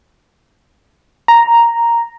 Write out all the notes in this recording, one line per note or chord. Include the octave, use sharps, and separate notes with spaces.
A#5